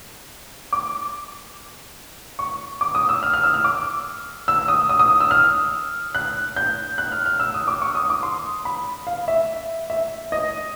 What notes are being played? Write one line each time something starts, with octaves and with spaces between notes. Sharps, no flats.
D6
C#6
D6
D#6
E6
F6
F6
E6
F6
D6
E6
D#6
D#6
D#6
E6
F6
F#6
G6
F#6
F6
F6
E6
D#6
D6
C#6
D#6
D6
C6
B5
F5
E5
E5
D#5